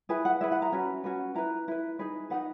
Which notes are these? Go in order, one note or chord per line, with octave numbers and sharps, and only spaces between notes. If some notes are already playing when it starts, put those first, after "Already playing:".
E4 G#4 B4 G#5
F#5
E4 G#4 B4 E5
F#5
A#5
C#4 F#4 B4
C#4 F#4 B4
E4 B4 A#5
E4 B4
D#4 G#4 B4
D#4 G#4 B4 F#5